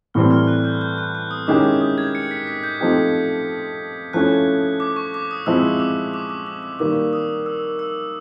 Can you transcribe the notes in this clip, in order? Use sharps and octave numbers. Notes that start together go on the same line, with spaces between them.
A2 E3 G3 C4 F6
F6
F#6
G6
G6
F#6
F#6
D#6
D#3 G#3 C#4 E4 G4 D6
D6
D#6
G#6
C#7
B6
B6
G6
F3 A3 C4 D#4 G4
F3 A3 C#4 E4 F#6
D6
C#6
D6
D#6
F3 G#3 C4 E4 E6
D6
D6
D6
D6
D6
D#3 G3 A#3 D6
D#6
E6
E6